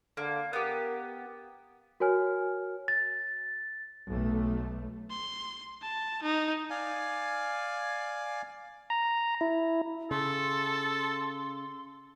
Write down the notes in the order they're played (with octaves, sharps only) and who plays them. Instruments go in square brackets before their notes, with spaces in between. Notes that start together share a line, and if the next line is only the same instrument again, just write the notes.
[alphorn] D3 [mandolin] A#3
[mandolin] B3 G4 [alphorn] A#4
[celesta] F#4 A#4 C#5 G#5 F6
[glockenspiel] A6
[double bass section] B1 A3
[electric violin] C6
A5
D#4
[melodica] D5 F5 G#5
[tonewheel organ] A#5
E4
[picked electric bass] C#3 [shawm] A4 [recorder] C6